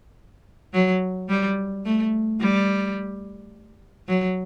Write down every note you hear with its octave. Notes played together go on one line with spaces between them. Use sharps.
F#3
G3
A3
G3
F#3